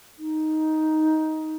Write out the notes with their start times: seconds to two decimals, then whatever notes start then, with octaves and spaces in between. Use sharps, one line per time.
0.19 D#4